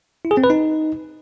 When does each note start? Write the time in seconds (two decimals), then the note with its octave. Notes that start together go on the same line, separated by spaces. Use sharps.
0.25 E4
0.31 G#4
0.37 C4
0.44 B4
0.50 D#4